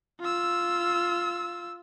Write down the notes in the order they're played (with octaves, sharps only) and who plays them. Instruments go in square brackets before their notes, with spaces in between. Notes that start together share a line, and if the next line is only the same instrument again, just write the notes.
[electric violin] F4 E6